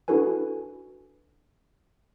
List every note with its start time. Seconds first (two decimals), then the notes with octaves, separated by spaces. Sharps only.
0.08 D4 E4 F#4 A4 B4 G#5